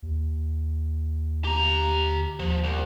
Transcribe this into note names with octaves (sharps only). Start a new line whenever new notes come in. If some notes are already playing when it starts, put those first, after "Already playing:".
D#2
G4 A#5
D#2 F3
C2